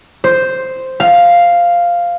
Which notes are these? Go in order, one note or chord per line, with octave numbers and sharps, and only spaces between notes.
C5
F5